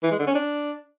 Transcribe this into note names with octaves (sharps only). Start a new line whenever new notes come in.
E3
G#3
D3
C#4
D4